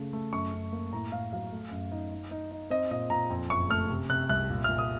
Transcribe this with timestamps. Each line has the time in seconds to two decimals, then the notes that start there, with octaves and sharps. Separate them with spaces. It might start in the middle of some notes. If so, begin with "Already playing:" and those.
Already playing: C#3 A3
0.13 A3
0.33 F#2 C#6
0.53 F#2
0.72 A#3
0.93 A2 A#5
1.12 A2 F5
1.32 F#3 F5
1.52 A3
1.71 F#2
1.92 D#4
2.12 D#4
2.31 D#4
2.51 D#4
2.70 C4 D#5
2.91 A#2 D#5
3.10 A#2 A#5
3.30 F2
3.50 F#1 C#6
3.70 A3 F6
3.89 C3
4.09 C3 F#6
4.29 C2 F#6
4.50 A#2
4.64 A#2 F6
4.78 D#6